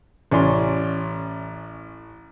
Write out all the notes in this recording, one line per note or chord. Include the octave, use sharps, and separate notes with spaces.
A1 C#4 D5 C6